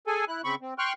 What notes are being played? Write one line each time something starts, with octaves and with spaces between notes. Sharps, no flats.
G#4 A4 G#5
E4 F#6
C#3 C4 B5 C#6
C4
G5 C6 C#6 F6 F#6